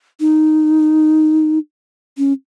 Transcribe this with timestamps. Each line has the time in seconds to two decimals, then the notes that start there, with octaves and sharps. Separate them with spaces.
0.20 D#4
2.18 C#4